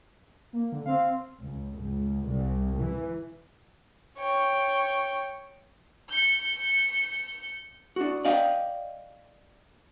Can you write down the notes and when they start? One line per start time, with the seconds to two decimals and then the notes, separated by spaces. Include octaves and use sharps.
0.53 A#3
0.72 D3
0.86 C4 F5
1.44 C#2
1.78 C#2
2.30 C2
2.81 E3
4.19 C#5 G5
6.09 G6 C#7
7.96 D4 F#4
8.25 D5 D#5 F5 G5